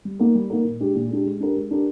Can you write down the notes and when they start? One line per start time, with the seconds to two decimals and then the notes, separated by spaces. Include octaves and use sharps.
0.05 G3
0.19 A#3 D#4 A#4
0.35 G3
0.50 A#3 D#4 A#4
0.65 A#2
0.80 G#3 D4 G4
0.95 A#2
1.10 G#3 D4 G4
1.25 G#3
1.40 D4 G4 A#4
1.56 G#3
1.71 D4 G4 A#4